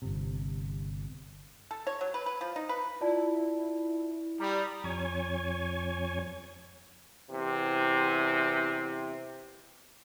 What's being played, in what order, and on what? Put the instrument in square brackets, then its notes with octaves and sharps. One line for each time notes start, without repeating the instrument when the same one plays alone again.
[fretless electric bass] G1 C3
[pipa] A4
C#5
F#3
B4
B4
F3
D#4
B4
[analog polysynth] E4 [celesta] F4 D5 A5
[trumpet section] G3 [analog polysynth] A#5 B5 D#6
[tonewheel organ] F2 C#5 G#5
[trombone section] E2 C3